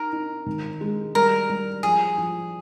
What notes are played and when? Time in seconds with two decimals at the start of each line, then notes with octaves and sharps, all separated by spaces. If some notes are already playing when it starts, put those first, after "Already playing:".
Already playing: D#4 A#4
0.12 D#4
0.46 D#3
0.81 G#3
1.15 G3 A#4
1.49 G3
1.83 F3 G#4
2.18 F3